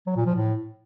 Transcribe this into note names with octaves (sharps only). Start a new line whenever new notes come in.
F#3
A#2
F3
A2